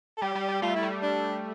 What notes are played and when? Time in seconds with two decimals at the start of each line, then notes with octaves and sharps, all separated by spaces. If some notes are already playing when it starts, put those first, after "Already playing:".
0.17 A4
0.22 G3 G4
0.35 G3
0.48 G3
0.62 A3 F4
0.76 E4
0.83 G3
1.02 D4